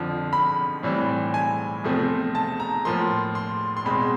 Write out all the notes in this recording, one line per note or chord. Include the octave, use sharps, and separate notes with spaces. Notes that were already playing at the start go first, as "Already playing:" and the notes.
Already playing: F2 D3 F3
B5
A2 E3 G3 C4
G#5
E2 C3 F3 A3 C4
A5
A#5
A2 F3 A#3 C6
C6
C6
E2 B2 G#3 C4 B5